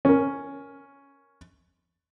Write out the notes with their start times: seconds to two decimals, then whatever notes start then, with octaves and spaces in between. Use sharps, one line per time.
0.05 C#4 A#4